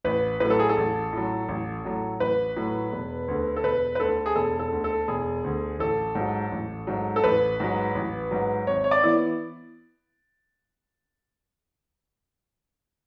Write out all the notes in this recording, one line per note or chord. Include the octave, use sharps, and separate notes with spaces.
A1 B4
A2 F#3 B4
A4
G#4
A4
A1
A2 F#3
A1
A2 F#3
A1 B4
A2 F#3
E1
D2 D3
A4
E1 B4
B4
D2 D3 A4
G#4
E1 A4
A4
D2 D3
A4
E1 G#4
D2 D3
A1 A4
G#2
F#3
A1
G#2 F#3
A4
A1 B4
G#2 F#3
A1
G#2 F#3
G#1 C#5
C#5
D5
E3 B3 E4